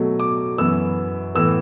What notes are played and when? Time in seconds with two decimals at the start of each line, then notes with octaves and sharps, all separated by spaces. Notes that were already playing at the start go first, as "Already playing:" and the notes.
Already playing: B2 F#3 A3
0.20 D6
0.58 F#2 E3 B3 E6
1.35 A2 E3 B3 E6